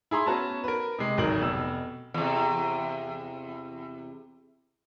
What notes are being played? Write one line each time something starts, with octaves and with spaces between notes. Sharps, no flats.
E4 G#4 A#5 C6
B3 C#4 F#4 B4 A5 A#5
A#4 B4
C3 G#3
D1 G#1 G#2 F#3 A#4 F#7
F1 B2 E6
E2 C3